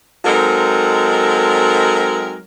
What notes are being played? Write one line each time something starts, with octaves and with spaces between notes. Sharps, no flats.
F#3 G#3 C4 D#4 A4 A#4